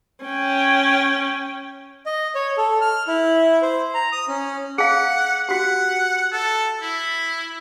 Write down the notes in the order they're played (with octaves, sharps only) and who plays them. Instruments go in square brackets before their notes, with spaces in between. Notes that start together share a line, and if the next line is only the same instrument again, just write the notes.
[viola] C#4 G5
[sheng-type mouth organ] D#5
C#5
A4
F6
E4
C5
A#5
D#6
C#4
[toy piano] G#4 F5 [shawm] F#5
[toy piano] F#4 G4 [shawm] F#5
[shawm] A4
E4